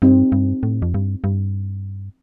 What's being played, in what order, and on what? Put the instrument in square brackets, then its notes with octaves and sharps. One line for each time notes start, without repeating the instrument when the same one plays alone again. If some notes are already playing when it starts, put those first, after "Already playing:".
[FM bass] G2 [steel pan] C4 D#4 G4
[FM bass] G2
A2
F2
G2
G2